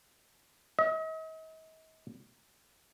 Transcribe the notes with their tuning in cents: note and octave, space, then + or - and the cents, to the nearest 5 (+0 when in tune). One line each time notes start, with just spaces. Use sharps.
D#5 +45